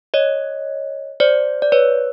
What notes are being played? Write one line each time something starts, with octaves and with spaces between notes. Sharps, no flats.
C#5 D#5
C5 D5
D5
B4 C#5